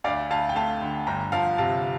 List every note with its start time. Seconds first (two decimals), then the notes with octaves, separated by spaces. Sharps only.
0.04 D2 D5 F5
0.30 D2 F5 A5
0.49 G5
0.56 A3 F5 A5
0.81 D3
1.07 G1 G5 A#5
1.32 F3 F5 A5
1.58 C3 F5 A5